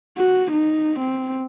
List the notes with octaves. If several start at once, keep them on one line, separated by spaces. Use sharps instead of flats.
F#4
D#4
C4